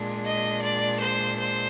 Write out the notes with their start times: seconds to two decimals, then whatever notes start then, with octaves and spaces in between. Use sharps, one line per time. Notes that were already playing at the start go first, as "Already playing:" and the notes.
Already playing: A#2 G#3 D4
0.24 D#5
0.62 D5
1.00 C5
1.37 C5